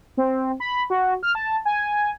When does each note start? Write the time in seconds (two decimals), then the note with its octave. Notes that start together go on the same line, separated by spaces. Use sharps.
0.17 C4
0.60 B5
0.90 F#4
1.23 F6
1.35 A5
1.65 G#5